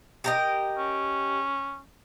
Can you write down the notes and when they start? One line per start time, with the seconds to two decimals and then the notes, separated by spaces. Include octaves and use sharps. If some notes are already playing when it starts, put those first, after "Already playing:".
0.24 G4 A#4 D#5
0.78 C#4